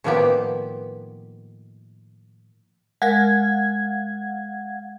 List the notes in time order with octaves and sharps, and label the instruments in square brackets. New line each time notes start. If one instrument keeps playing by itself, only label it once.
[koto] A2 D#3 F3 A#3 B3 G4
[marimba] G#3 A#4 [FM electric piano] F5 F#5 G#6